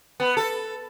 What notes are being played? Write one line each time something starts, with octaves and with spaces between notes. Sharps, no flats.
B3
A4